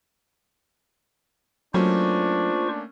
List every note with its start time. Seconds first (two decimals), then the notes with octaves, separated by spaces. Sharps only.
1.74 F#3 A3 A#3 C#4 D4 F4 C5 C#6